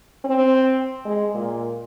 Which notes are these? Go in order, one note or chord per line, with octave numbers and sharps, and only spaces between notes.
C4
G#3
A#2